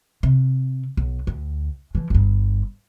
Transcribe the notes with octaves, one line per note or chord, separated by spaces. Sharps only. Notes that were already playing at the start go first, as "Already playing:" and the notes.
C3
B1
D2
E3 F3
G1 G2